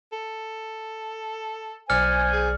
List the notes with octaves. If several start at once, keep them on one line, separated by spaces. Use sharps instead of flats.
A4
B1 C5 D5 G#5 F6 C#7
G#4